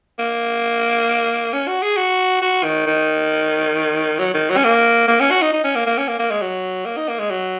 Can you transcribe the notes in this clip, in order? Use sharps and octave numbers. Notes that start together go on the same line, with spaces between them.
A#3
C#4
F#4
G#4
F#4
F#4
D#3
D#3
F#3
D#3
F#3
C#4
A#3
A#3
C#4
F#4
D#4
D#4
C#4
A#3
A#3
C#4
A#3
A#3
G#3
F#3
A#3
D#4
A#3
G#3
F#3